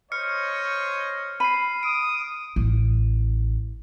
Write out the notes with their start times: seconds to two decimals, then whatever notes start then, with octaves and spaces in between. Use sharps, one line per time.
0.12 C5 C#5 D#5 F6 C#7
1.40 B5 C7 D#7
1.83 D#6 D7
2.56 A1